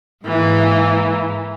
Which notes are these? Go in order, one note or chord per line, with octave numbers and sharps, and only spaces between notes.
G#2 E3 A#3